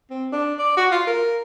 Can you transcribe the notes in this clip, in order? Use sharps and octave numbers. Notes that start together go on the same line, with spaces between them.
C4
D4
D5
F#4
F4
A#4